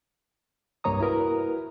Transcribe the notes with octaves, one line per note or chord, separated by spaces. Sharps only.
C2 G2 A#3 C#5 A#5 D#6
E4 F#4 A#4 B4